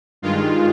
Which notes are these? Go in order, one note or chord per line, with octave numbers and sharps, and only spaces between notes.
G2 D#3 G#3 F4